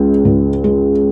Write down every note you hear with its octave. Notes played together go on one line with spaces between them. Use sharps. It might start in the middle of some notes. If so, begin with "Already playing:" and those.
Already playing: C#2 G#3
C#2
G#3